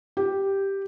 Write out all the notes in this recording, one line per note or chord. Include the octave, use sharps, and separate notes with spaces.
G4